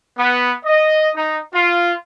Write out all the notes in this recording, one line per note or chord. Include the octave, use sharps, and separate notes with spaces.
B3
D#5
D#4
F4